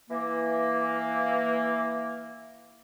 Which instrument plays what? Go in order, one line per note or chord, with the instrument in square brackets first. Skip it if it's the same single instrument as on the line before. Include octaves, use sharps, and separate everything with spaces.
[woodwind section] E3 A#3